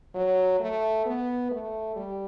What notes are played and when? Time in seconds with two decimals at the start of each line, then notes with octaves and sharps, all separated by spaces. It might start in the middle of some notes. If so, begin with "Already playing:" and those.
0.14 F#3
0.60 A3
1.05 B3
1.51 A3
1.96 G3